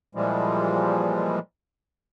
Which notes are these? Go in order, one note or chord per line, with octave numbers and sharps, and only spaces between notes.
A#2 E3 F3 G3 G#3